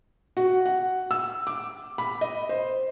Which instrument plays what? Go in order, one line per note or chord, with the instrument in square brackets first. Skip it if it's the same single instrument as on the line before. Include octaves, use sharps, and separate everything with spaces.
[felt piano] F#4
F#5
E6
D6
B5
D#5
C5